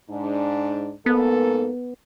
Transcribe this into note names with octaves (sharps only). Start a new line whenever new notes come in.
G#2 D4
G#2 A#3 B3 A4